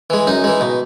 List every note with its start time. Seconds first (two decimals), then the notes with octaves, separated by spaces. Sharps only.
0.10 E3 G#3
0.27 F#2 D#4
0.44 E3 G#3
0.61 B2